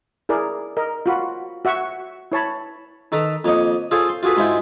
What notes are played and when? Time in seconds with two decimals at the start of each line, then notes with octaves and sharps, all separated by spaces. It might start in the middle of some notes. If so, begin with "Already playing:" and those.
0.29 E4 G#4 A#4 D5
0.77 A#4 D#5
1.06 F4 F#4 B5
1.65 F#4 E5 F#5 C#6 E6
2.32 E4 C#5 A5 B5
3.12 D#3 A4 B4 A#5
3.45 F2 A#3 C#5 D#5
3.91 F4 G#4 A4 C5 C#5
4.09 C6
4.23 F4 F#4 G#4 A4 B4
4.37 G#2 G#3 E4 F4 G5